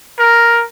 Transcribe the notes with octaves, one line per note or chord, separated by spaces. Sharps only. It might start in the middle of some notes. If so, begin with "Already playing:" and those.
A#4